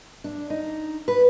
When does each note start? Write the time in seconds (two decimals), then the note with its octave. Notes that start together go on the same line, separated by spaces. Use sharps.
0.24 D4
0.50 D#4
1.08 B4